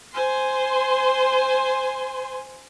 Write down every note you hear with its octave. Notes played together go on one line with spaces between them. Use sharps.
C5 G#5 C6